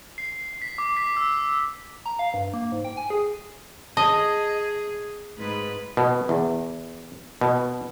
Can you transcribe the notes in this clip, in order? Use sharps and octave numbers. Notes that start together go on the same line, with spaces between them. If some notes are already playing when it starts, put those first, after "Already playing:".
C7
B6
D6
B6
E6
A#5
F5
G2
A#3
G#2
G5
G#5
G#4
G#4 D#5 A5
G#2 B4
B2
E2
B2